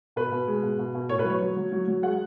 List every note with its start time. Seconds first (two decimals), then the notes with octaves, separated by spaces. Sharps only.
0.16 B2 B4
0.32 B2
0.47 G#3
0.63 B2
0.79 B2
0.95 B2
1.09 A2 C#5
1.19 B4
1.25 F#3 C#5
1.42 F#3
1.56 F#3
1.72 F#3
1.88 F#3
2.03 G#3 F#5